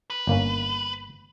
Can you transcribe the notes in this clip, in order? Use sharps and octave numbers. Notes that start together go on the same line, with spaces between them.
B4
G1 A#3 C#4